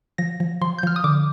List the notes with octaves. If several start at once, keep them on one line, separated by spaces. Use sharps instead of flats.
F3 A#6
F3
F3 C6
G6
F3 F6
D#6
D3 D6